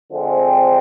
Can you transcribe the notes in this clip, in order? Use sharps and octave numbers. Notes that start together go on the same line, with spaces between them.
D3 F3 G#3 C4